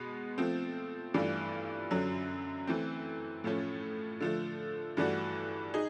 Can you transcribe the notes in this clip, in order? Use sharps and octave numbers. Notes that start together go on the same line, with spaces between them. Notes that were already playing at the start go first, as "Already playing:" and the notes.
Already playing: B2 G#3 B3
F3 A3 C4
G2 E3 A3 D4 F4
F#2 D3 F#3
E3 A3 C4
A2 F3 A3 C#4
D3 F3 A3
G2 E3 A3 D4 F#4
D#4 G#4